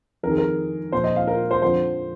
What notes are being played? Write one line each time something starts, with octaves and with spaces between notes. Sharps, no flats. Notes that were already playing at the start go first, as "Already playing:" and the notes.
F2 D#3 G#4 A#4
A#4
A#2 F3 C5
D#5
F5
A#4
C5
F2 D3 F3 C5